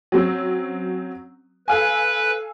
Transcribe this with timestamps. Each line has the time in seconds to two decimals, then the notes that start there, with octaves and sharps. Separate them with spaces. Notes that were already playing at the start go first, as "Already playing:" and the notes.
0.12 F#3 C4 C#4
1.68 A4 B4 F5 G#5